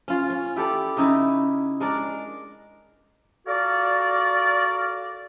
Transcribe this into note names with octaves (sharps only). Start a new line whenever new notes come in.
C#4 F4
C#4
E4 G4 A4 D5
C#3 D#4 E4
G#3 D4 A#4 D5
F4 F#4 A4 A#4 D5